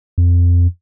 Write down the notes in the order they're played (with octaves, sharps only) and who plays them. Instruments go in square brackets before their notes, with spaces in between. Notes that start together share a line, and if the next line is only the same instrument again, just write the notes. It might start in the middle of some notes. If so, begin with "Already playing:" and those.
[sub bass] F2